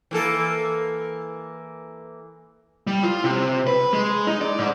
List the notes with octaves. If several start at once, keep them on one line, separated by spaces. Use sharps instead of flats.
E3 A#3 A4
G3
F4
C3
B4
G#3
D#4
D5
G#2